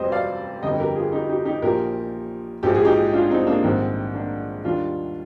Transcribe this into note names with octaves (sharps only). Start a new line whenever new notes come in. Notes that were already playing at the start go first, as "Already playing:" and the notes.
Already playing: F1 F2 C3 G3 C5 D#5
D5 F5
G1 F2 D3 G3 D#5 G5
G4 A#4
F4 G#4
D#4 G4
D#4 G4
D#4 G4
A#1 A#2 F3 G4 A#4
A#1 G#2 F3 G#3 G4
G#4
D#4 G4
D4 F4
C4 D#4
A#3 D4
A#1 G#2 D#3 G3 C4
A#3 D4
D#2 D#3 G3 D4 F4